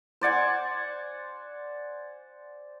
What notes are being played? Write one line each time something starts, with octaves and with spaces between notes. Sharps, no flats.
C5 D5 F#5 G#5